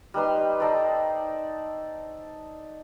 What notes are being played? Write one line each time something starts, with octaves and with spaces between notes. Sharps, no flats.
G3 D#4 B4 C6
D#4 A4 C5 D5